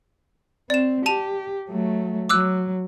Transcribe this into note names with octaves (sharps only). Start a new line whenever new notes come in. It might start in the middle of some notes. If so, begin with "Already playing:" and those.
C4 D5 E7
G4 A5 D#7 F7
F#3 A3
F#3 D6 E6 F#6